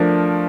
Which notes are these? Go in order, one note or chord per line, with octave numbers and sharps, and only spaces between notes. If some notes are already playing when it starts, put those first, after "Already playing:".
Already playing: F3 A3 D4 A#4